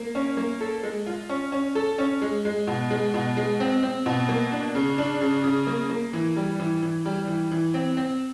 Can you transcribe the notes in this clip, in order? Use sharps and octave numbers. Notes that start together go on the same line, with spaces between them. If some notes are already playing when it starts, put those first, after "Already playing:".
Already playing: A#3
C#4
A#3
A4
G#3
F4
C#4
C#4
A4
C#4
G#3
G#3
B2
G#3
B2
G#3
C4
C4
B2
A#3
D4
C#3
D4
C#3
C#3
A#3
A#3
E3
G3
E3
E3
G3
E3
E3
C4
C4